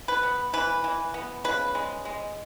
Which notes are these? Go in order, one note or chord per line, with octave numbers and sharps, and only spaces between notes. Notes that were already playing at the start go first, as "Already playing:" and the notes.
B4
B3
E3 B4
E3
B3
C#3 B4
G#3
G#3